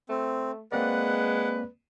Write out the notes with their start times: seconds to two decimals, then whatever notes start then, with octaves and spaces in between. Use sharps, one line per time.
0.09 A3 C4
0.72 G#3 A#3 C4 B4 D5 F#5